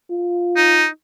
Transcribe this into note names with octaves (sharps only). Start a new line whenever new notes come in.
F4
D#4